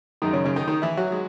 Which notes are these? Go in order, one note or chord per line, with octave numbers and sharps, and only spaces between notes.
F#2 D#3 G#3 D#4
C#3 C#4
C#3 C#4
D#3 D#4
D#3 D#4
E3 E4
F#3 F#4
G#3